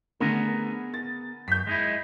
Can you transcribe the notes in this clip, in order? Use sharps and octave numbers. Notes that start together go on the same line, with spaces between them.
D3 A3 B3 G#4 A#4
A6
F#2 G6 B6
G#3 D#4 E4